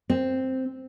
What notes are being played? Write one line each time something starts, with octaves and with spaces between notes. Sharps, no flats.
C4